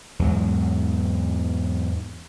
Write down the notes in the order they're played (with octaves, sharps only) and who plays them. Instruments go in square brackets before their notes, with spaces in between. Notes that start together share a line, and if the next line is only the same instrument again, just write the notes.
[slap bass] E2 G#2 F#3